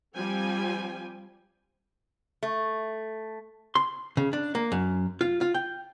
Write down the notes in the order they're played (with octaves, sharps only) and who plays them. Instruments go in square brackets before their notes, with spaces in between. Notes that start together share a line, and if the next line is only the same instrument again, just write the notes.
[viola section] F3 G3 C4 G5 G#5
[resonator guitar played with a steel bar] A3
[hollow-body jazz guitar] C6
C#3
D4
A#3
F#2
F4
F4
G5